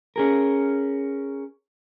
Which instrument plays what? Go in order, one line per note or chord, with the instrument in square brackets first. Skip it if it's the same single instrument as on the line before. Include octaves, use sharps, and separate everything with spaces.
[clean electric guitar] C#4 G#4 A#4